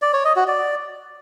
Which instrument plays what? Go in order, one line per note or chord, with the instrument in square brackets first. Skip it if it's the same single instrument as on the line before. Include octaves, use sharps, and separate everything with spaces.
[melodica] D5
C#5
D#5
F#4
D5